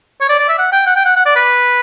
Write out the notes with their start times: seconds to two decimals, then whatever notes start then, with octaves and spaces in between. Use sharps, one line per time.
0.21 C#5
0.29 D5
0.39 D5
0.49 E5
0.58 F#5
0.72 G5
0.87 F#5
0.96 G5
1.05 F#5
1.16 F#5
1.26 D5
1.36 B4